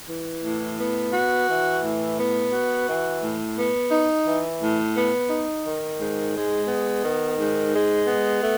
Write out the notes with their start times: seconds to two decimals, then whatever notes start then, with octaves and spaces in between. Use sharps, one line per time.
0.09 E3
0.43 A2
0.78 B3
1.12 F#4
1.47 E3
1.82 A2
2.17 B3
2.52 F#4
2.87 E3
3.20 A2
3.56 B3
3.90 D#4
4.25 E3
4.60 A2
4.94 B3
5.28 D#4
5.63 D#3
5.98 G#2
6.33 G#3
6.67 B3
7.02 D#3
7.37 G#2
7.72 G#3
8.06 B3
8.41 A3